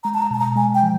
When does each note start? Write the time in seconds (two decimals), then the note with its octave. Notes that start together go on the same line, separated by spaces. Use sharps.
0.04 G#3 A#5
0.14 A5
0.22 A#5
0.31 B2 A5
0.39 A#5
0.56 G#3 G#5
0.74 G5
0.83 F3